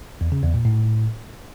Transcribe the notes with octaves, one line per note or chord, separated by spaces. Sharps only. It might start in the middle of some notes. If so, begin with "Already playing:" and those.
E2
C#3
E2
A#2
A2